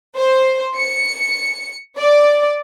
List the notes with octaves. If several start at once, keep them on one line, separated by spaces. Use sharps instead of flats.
C5
C#7
D5